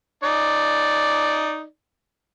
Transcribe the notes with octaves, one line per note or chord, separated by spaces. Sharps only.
D#4 D5